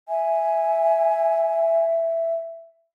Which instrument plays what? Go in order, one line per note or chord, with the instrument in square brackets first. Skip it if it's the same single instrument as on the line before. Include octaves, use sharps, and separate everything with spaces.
[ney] E5 [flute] G#5